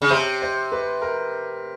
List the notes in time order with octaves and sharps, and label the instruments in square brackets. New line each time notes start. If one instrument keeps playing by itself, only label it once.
[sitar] C#3
[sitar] C3 [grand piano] C5
[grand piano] C5
B4
A#4